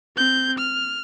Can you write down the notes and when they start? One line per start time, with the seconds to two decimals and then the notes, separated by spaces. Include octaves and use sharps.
0.17 C4 G6
0.58 F6